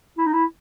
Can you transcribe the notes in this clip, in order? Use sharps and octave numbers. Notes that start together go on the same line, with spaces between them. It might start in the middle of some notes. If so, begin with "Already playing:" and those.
E4
D#4
E4